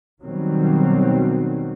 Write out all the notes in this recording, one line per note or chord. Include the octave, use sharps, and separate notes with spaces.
B2 D#3 F#3 G3 C4